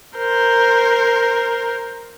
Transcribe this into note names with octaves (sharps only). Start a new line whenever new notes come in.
A#4 C5